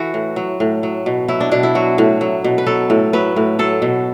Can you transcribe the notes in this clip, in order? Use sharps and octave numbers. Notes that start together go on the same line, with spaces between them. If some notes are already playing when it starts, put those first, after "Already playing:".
Already playing: E3 F#4 A4
A2
F#3
A2
F#3
B2
F#3 E4
D4
B2 D4
E4
F#3 F#4
A2
F#3
B2
B4
F#3 A4
A2
F#3 B4
A2
F#3 A4
B2